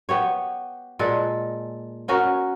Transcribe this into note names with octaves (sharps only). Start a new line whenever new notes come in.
B3 G4 C#5
A#2 G#3 A4 B4
B3 C#4 F#4 A#4